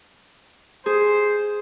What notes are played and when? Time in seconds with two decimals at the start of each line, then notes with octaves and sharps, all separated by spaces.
0.86 G#4 C5